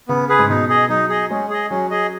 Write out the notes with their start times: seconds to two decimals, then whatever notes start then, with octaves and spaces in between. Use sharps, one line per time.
0.08 C#3 B3
0.29 G#4 B4
0.39 G#2
0.49 B2 D#4
0.69 G#4 D#5
0.89 F#3 D#4
1.09 G#4 D#5
1.30 G#3 C#4
1.50 G#4 D#5
1.70 F#3 C#4
1.91 G#4 D#5